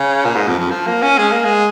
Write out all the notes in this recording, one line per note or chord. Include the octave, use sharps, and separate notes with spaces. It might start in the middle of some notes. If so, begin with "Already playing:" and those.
Already playing: C#3
A#2
G#2
F2
F2
F3
A#3
C#4
G#3
A#3
G#3